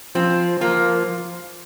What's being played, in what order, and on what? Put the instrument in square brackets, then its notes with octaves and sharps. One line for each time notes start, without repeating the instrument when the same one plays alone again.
[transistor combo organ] F3 [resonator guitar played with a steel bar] C4
[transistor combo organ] F3 [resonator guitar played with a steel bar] A#3